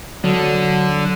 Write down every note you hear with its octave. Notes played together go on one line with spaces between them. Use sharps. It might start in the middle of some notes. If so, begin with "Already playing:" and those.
D3 F#3